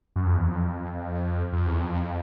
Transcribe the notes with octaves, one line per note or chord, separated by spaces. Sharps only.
F#2
F2
E2
F2
F2
E2
F2